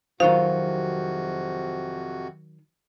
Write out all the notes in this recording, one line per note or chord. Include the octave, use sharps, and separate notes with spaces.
F2 C3 D#3 F#3 F4 F#4 C5 F5